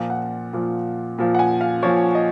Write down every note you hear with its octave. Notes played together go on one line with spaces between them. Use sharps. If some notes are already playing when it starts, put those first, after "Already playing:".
Already playing: A#2 F3
F#5
A#2 F3
A#2 F3
F#5
G#5
F5
A#2 F3 C#5
D#5